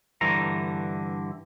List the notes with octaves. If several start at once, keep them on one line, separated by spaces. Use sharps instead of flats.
G2 D3 E3 A#5